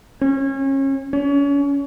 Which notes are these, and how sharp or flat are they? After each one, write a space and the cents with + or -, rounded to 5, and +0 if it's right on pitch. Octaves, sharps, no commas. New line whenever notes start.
C#4 -30
C#4 +35